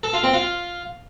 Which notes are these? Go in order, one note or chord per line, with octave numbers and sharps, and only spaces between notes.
A4
F4
C4
F4